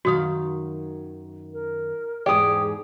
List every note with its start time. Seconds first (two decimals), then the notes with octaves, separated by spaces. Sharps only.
0.05 F#2 D#3 F#4 F5 D#6
1.53 A#4
2.26 E2 G#2 G4 G#4 D5 D#6